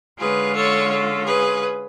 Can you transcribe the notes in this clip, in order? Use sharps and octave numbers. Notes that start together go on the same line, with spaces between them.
D3 G#3 C#4 F4 G#4 B4
A4 C#5
A4
G#4 B4